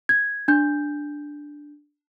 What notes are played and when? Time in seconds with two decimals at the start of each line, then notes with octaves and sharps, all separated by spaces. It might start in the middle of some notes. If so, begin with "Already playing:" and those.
0.09 G#6
0.48 D4 G6